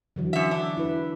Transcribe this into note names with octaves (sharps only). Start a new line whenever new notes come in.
D3 E3 F#3
F#2 E5
D4
E4 B4